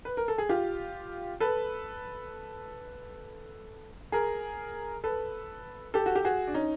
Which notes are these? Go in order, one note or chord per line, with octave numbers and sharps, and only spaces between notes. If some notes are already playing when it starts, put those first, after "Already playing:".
B4
A#4
A4
G#4
F4 G4
A4 B4
G#4 A#4
A4 B4
G4 A4
F#4
G4
F#4 G#4
D4
C#4 D#4